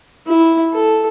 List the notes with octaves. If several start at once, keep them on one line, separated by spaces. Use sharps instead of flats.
E4
A4